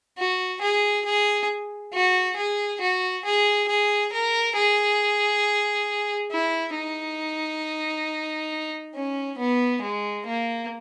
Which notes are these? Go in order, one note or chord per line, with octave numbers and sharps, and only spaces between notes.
F#4
G#4
G#4
F#4
G#4
F#4
G#4
G#4
A#4
G#4
E4
D#4
C#4
B3
G#3
A#3